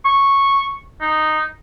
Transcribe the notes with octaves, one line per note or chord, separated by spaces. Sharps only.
C#6
D#4